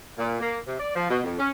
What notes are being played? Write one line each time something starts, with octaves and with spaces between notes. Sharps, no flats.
A#2
A#3
C3
D5
F3
B2
F2
C#4